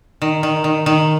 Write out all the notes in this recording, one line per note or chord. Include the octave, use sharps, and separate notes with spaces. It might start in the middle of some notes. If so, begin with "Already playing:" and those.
D#3
D#3
D#3
D#3